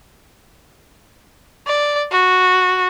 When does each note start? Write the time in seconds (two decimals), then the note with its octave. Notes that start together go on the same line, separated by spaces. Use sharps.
1.67 D5
2.11 F#4